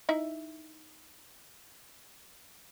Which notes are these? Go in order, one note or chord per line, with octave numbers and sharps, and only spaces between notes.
D#4 E4 E5